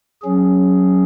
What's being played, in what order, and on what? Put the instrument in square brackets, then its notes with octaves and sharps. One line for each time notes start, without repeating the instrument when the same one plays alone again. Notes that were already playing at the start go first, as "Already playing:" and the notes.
[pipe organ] F#3 C#4 G#4